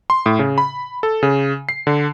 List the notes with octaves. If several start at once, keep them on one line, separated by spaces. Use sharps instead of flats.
C6
A2
C#3
B5
A4
C#3
C7
D3